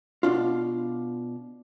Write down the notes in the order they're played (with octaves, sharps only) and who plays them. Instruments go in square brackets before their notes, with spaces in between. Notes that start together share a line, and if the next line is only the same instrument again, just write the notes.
[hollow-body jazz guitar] B2 C#4 D4 F4